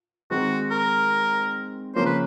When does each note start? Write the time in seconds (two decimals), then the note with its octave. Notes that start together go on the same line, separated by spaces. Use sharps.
0.30 D#3 G#3 C4 D#4 F#4
0.71 A#4
1.95 C#3 F3 A#3 C#4 C5
2.06 B4